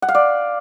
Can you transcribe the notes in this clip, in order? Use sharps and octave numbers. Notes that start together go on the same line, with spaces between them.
F#5
F5
D5